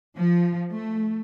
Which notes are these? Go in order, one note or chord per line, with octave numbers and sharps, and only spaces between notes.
F3
A3